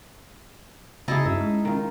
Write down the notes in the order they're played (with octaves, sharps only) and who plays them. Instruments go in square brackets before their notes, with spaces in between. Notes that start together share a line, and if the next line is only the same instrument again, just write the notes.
[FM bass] C#3 [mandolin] D#4 D#5 A5 [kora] E4 G#4 [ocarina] F#4
[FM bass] G2 [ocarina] C#4 [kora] E5
[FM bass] G#3
[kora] D#3 F4